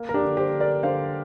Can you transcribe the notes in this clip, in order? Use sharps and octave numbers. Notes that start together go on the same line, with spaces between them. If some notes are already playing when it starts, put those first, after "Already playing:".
Already playing: A#3
A#4
D4 G4
D3
G4 C5
D3
A#4 D5
D3 C5 F5